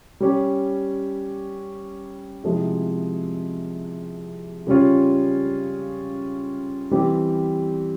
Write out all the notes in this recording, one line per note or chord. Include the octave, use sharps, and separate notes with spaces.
G3 C#4 G4
C3 F3 G#3 C4 E4
C#3 G3 C#4 F4
E3 G3 C4 G4